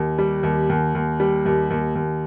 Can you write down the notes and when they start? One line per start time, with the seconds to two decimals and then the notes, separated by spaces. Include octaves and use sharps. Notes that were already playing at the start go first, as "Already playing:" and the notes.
Already playing: D#2
0.18 G3
0.43 D#2
0.69 D#2
0.95 D#2
1.20 G3
1.45 D#2
1.70 D#2
1.95 D#2